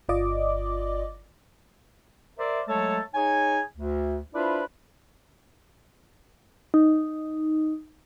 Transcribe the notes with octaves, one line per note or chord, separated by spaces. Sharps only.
G1 F4 D5 D#5 D6
A#4 C5 D5 E5
F#3 G#3 A3 A4 C#5 A5
D#4 G#4 C#5 G#5
D2
D4 E4 F4 B4 C5 D5
D#4